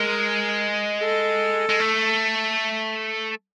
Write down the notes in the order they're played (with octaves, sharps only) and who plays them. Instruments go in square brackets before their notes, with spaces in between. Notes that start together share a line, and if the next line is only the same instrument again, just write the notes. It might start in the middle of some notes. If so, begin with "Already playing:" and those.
Already playing: [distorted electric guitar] G#3 [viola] A#4
[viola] A4
[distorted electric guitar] G#3
A3